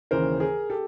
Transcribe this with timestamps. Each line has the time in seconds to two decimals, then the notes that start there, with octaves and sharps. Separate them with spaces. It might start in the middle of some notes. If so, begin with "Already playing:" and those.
0.11 D#2 C#3 E3 A#4 C5
0.40 G#4 A#4
0.70 G4 A4